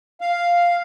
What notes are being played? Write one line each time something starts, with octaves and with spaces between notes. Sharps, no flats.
F5